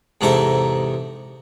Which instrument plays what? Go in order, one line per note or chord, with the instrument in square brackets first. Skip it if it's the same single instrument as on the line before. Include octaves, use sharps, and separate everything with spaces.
[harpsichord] E2 G#2 C3 D#4 A4 E5